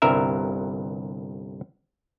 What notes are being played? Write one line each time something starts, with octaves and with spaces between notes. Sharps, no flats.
G1 C2 G2 A#4 E5